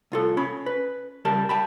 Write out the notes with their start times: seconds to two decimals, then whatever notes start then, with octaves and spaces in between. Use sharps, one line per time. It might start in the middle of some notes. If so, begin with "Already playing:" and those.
0.12 C2 F4 A4
0.37 C#4 B5
0.66 B4
1.25 C#2 G3 A#4 A5
1.49 G5 A5 B5